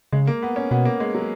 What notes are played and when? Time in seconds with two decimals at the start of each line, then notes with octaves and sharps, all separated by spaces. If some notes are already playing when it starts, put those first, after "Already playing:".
0.12 C#3 G#3
0.27 A#3
0.43 B3
0.56 C#4
0.71 B2 B3
0.85 A#3
1.00 G#3
1.15 F#3